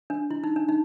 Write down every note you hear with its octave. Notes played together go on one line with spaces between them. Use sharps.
D4
E4
D#4
D4
D#4